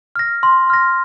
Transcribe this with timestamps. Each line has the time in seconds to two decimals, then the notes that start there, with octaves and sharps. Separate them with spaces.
0.16 F6 A#6
0.43 C6
0.70 F6 A#6